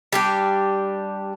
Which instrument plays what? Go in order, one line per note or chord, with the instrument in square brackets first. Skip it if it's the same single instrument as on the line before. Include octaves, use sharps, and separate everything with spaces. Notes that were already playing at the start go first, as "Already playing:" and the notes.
[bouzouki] G3 D4 G4